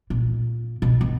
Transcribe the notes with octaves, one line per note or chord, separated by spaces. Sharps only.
A#2
B2
B2